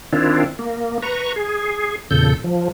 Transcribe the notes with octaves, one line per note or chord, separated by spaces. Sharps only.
D#3 C4 D4 E4 F4
A#3
B4 A#5 C#6
G#4
E2 A#2 C#3 A4 G6
F3